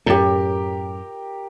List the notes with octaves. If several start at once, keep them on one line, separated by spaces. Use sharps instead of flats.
F#2 A2 G4 A#4